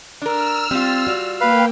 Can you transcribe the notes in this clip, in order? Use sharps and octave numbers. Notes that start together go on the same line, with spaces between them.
D4 A#4 E6 F6
G3 C4 F4
F#4 D5
A#3 B4 F5 G5